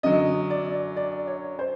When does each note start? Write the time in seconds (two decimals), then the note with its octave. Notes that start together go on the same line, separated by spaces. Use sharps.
0.03 F#2 D3 F#3 D#5
0.50 D5
0.96 D5
1.27 C#5
1.59 C5